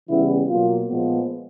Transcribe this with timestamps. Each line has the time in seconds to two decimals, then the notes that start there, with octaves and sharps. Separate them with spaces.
0.09 C#3 E3 G3 B3 E4
0.49 B2 F#3 A#3 F4
0.89 A#2 F3 G#3 B3